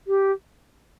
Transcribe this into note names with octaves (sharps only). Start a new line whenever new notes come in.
G4